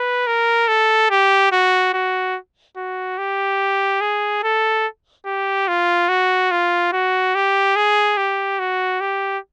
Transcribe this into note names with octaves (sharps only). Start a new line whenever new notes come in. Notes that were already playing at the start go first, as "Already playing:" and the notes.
Already playing: B4
A#4
A4
G4
F#4
F#4
F#4
G4
G#4
A4
G4
F4
F#4
F4
F#4
G4
G#4
G4
F#4
G4